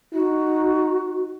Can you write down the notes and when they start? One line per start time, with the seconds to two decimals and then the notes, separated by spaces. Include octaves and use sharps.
0.14 D#4 F#4